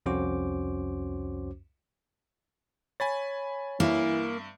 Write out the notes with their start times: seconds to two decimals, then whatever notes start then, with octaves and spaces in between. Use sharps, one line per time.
0.06 C2 F2 C#4 F#4 C5 D6
3.00 C#5 G#5 B5 A6
3.80 G2 E3 A#3 E5